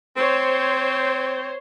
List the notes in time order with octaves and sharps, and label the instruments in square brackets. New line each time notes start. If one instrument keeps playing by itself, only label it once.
[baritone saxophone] C4 [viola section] C5 C#5